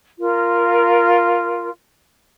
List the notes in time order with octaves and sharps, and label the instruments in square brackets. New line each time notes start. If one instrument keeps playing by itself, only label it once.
[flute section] F4 A#4